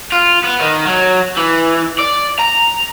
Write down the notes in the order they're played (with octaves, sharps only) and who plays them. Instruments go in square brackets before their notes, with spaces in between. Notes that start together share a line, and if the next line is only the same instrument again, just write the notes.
[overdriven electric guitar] F4
B3
D#3
F#3
E3
D5
A#5